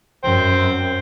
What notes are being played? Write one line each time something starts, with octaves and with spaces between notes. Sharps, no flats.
F#2 C5 G5